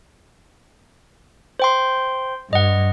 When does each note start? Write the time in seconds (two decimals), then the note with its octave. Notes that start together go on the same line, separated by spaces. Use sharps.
1.59 C5 G5 C6
2.53 G2 D#5 F#5